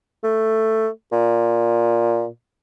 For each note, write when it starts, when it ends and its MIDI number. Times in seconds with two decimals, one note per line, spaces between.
0.24 0.88 57
1.12 2.28 46